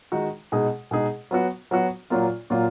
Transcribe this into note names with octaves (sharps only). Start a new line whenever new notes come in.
D#3 G#3 D#4 F#4
B2 G#3 D#4 G#4
B2 G#3 D#4 G#4
F#3 B3 F#4
F#3 B3 F#4
A#2 F#3 A#3 F4
A#2 F#3 A#3 F4